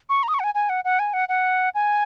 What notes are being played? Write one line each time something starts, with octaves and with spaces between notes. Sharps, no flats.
C#6
A#5
D#6
C#6
F#5
G#5
G#5
F#5
F#5
G#5
F#5
F#5
G#5